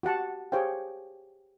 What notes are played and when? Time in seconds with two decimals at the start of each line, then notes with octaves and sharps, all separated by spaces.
0.03 F#4 G4 F#5 A5
0.52 G4 G#4 C5 C#5 F5 G5